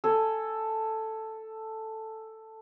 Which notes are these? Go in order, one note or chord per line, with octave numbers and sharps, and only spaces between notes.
A4 G#5